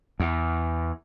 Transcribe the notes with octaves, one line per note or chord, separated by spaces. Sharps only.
E2